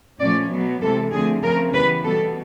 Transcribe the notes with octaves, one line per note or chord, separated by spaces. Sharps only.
A#2 F3 A3 C#4 D5
B2 F#3 B3
C3 E3 G#3 A4
D3 F3 A3 C4 G#4
C#3 F3 A3 C4 A#4
E3 G3 B3 B4
B2 G3 B3 A4